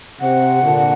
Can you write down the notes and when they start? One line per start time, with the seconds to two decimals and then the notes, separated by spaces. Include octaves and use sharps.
0.21 C3 F#5
0.63 A#2 D3